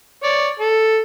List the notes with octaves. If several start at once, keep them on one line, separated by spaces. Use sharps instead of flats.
C#5 D5
A4